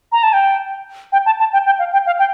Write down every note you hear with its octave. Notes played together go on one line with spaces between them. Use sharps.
A#5
A5
G5
G5
A5
A5
G5
G5
F5
G5
F5
G5